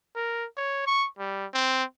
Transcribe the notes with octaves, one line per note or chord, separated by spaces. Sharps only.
A#4
C#5
C#6
G3
C4